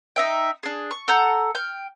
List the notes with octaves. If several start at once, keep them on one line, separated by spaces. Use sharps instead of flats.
D#4 E5 G5
D4 G#4
C#6
A4 F#5 A#5 G6
G5 F6